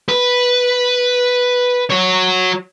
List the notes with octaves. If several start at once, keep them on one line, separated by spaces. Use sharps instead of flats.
B4
F#4 C#5